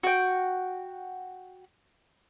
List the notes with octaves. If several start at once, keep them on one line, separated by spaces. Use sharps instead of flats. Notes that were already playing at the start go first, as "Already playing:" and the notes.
F#4 G5